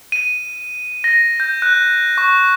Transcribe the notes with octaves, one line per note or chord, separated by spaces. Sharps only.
D#7
A#6
G6
F#6
C#6